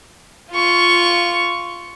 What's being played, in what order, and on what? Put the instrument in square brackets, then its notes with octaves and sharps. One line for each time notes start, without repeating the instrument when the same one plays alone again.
[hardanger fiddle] F4 C#6